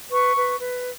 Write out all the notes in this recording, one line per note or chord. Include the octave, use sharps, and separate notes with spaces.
B4 C#6
B4
B4